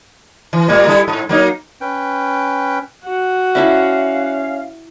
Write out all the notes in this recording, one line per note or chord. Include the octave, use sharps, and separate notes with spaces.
E3
A2 G3 A#3
G3 E4 A4
G#2
F#3 A#3 D#4
C#4 B4 G5
F#4 F#5
C#4 E4 A4 B4 D5 E5 F5